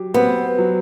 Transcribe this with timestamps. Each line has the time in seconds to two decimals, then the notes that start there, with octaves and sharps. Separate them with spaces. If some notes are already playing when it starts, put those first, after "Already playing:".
Already playing: F#3 G4
0.14 B3 C4
0.58 F#3